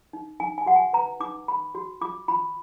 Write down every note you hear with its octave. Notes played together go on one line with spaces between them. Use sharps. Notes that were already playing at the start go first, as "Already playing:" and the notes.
D#4
D#4 G#5
G#5
F#4 F#5
G#5
B4 A#5
D#4 D6
D#4 B5
F#4
F4 D6
F4 B5